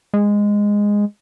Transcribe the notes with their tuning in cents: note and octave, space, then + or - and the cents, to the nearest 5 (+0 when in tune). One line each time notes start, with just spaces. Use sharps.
G#3 -10